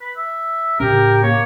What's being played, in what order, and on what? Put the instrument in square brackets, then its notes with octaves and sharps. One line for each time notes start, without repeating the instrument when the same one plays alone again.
[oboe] B4
E5
[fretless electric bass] A2 C#3 C#4 [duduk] G4 [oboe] A#4
[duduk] A#3 [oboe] C#5